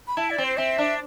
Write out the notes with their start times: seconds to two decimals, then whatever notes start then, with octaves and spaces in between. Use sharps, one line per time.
0.08 B5
0.17 E4 A5
0.30 D5
0.38 C4
0.44 C5
0.57 C4 E5
0.78 D4